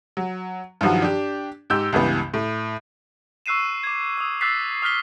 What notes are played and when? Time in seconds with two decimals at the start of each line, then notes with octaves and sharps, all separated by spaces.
0.17 F#3
0.81 G2 D#3 F3 F#3 F#4
1.02 D4 G4
1.70 G#2 G4 E6 G6
1.93 C#2 G2 E3 B3
2.34 A2
3.46 C#6 E6 F#6 C7 D#7 E7
3.84 D6 G#6
4.18 D#6 E6
4.41 D6 E6 F#6 A6 B6 C7
4.82 D#6 F6 F#6 B6 G7